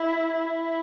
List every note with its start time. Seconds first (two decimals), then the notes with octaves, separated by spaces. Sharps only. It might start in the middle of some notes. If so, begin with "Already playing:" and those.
Already playing: E4
0.33 E4